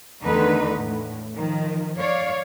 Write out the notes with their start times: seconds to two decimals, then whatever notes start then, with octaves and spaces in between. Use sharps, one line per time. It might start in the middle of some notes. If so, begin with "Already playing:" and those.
0.23 E2 D3 D#3 A3 D#4 B4
0.81 A2
1.35 D#3 F3
1.98 C#5 D5 F5